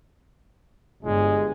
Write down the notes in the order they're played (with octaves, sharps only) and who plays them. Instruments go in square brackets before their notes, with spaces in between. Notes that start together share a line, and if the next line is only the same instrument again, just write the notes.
[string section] G1 [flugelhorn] G#3